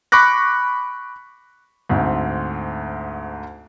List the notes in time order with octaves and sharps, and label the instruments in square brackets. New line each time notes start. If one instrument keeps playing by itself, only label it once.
[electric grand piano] B5 C#6 D6 F#6 A#6
[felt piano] D2 G#2 C4